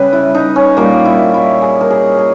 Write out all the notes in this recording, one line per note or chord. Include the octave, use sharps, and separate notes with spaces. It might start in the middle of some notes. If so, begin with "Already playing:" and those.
Already playing: C#3 G3 B4
E4
D#4
C#4
A#2 G3 A#3 D#4
E4
E4
G#4
A#4
G#4
G#4